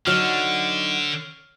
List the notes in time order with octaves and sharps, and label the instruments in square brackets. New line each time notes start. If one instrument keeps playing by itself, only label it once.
[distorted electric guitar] D3 [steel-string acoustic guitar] F#3 D#4 F#4 [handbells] C#5 F6